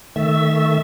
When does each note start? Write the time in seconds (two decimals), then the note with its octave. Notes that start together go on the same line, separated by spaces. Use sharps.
0.16 D#3 A3 E5